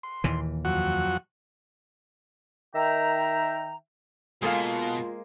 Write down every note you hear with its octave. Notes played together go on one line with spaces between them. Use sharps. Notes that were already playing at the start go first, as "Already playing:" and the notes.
C6
D#2 A#2 E3
F2 F#3 F#4
D#3 E5 G5 A#5
B2 G#3 A#3 F4 G#4 A4 C5 F5